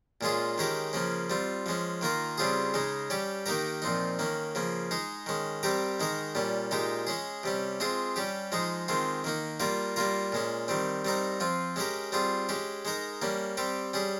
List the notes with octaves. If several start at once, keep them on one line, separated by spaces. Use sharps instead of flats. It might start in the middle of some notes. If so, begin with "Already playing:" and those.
A#2 G#3 C#4 F4 G#4
D#3 G#3 C#4 G4 A#4
C#3 F3 A#3 C#4
G3 C4 F4
F3 G#3 C#4
D#3 A#3 F4 A#4
C#3 G3 C4 F4 G#4
C#3 G#3 D#4
G3 C#4 G4
D#3 A#3 D#4 G4 A#4
A#2 F3 C4 D#4
D#3 A#3 C#4
C#3 F3 A#3
G#3 D#4 G#4
D#3 G#3 C#4
G3 C4 G4 A#4
D#3 G#3 D#4 A#4
A#2 G3 C#4
A#2 G#3 D#4 G4
G#3 C#4 G#4
C3 G3 C#4
G#3 C4 F4 G#4
G3 C#4 G4
F3 G#3 D#4 G#4
D#3 G#3 C4 F4
D#3 A#3 D#4
G3 A#3 F4 A#4
G3 A#3 F4 A#4
A#2 G#3 C#4
D#3 G3 C4
G3 C4 D#4 A#4
F3 C4 F4
G#3 C#4 G4 A#4
G3 C4 F4 G#4
G#3 C#4 G4
G#3 D#4 A#4
G3 A#3 C#4
G3 C4 G4
G3 C#4 G#4